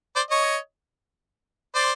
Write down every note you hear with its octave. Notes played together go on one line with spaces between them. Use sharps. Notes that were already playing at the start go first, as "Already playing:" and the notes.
C5 D5
C#5 D#5
C5 D5